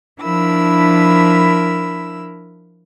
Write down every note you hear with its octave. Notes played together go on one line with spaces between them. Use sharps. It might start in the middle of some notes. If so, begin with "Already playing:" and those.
F3 D4 E4 A#4 B5 E6